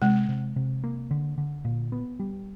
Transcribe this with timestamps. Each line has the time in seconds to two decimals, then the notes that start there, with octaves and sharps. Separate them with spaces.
0.02 C3 G#3
0.29 C3
0.56 C3
0.84 A#3
1.11 D3
1.38 D3
1.65 A#2
1.92 B3
2.20 G3